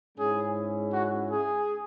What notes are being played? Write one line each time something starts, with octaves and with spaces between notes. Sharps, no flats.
G#2 G#3 C#4 E4 G#4
F#4
G#4